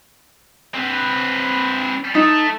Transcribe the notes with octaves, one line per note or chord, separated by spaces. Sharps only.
C4 B4
A3 D#4